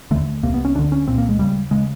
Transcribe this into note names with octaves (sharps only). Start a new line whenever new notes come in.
D#2 D3 A3
C2 C3 A#3
B3
C#4
D2 D3 D4
C#4
C2 A#2 C4
A#3
G#3
D#2 C#3 G3
C#3 G#3